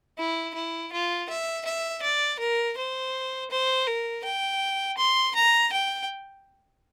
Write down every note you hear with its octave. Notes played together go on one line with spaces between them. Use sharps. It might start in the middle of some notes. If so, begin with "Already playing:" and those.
E4
E4
F4
E5
E5
D5
A#4
C5
C5
A#4
G5
C6
A#5
G5